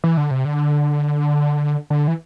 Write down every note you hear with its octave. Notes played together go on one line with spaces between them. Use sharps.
E3
D3
C3
D3
D3
E3